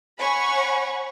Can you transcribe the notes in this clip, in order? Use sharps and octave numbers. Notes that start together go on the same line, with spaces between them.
C#5 F#5 G#5 B5 C#6